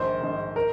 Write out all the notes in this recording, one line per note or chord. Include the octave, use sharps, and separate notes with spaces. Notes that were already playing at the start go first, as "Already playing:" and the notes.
Already playing: A#1 G#2 D#3 C5
A#1 G#2 D#3
A#4